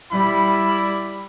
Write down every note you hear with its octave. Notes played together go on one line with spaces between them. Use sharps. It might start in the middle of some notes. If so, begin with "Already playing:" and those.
G3 E4 D5 B5